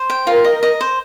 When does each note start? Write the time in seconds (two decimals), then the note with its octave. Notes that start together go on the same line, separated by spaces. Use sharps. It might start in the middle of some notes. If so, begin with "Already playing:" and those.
Already playing: C5
0.10 G5
0.27 F4 A#4
0.45 D#5
0.63 D#5
0.81 C5